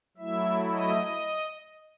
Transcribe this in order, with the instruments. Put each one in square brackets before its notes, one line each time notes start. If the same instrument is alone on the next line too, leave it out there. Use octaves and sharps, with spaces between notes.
[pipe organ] F#3 A3 E4 E5
D#5